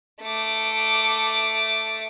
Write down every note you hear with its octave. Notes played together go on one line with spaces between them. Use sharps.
A3 D6